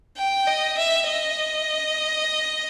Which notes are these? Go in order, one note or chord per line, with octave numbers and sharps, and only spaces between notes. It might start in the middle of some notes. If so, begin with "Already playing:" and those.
G5
D#5
E5
D#5